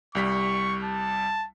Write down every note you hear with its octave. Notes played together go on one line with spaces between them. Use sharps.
C2 G3 C#6 B6
A5